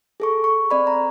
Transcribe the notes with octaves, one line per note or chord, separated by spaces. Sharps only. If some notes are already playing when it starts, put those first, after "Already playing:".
G#4 A4 C#6
C#6
C4 D5 B5
A#5